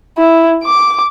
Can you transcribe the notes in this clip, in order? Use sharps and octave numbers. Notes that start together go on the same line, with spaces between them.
E4
D6